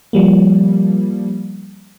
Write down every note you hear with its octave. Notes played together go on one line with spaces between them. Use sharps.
F3 G3 A#3